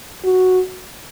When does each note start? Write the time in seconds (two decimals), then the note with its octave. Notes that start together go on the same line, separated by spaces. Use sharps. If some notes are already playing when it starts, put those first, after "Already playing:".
0.24 F#4